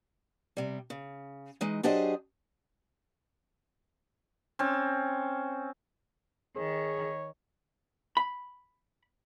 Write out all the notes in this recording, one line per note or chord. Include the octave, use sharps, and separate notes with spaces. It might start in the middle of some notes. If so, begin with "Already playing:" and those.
C3 G3
C#3
E3 G#3 D#4
F#3 D4 G4 G#4 C5 D#5
C4 C#4
D#3 G#4 C#5
B5